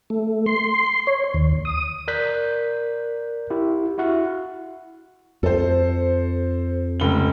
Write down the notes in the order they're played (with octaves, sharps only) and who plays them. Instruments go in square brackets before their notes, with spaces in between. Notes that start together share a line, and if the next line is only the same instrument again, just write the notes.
[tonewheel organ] A3
C6
C#5
D#2
D#6
[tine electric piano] A#4 D5 F#6 G6 B6
E4 G4
E4 F#4 E5 F#5
[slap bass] F2 [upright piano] A4 C5
[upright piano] F1 C#2 G7